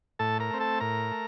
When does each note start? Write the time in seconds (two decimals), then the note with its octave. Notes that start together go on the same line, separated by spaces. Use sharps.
0.19 A2 A4 A5
0.40 A#4 A#5
0.50 A3 C4
0.60 A4 A5
0.80 A2 A#4 A#5
1.12 A3